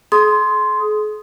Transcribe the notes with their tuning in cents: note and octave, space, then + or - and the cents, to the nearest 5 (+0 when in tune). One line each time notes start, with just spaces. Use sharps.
G#4 +45 C6 +0 D#6 +0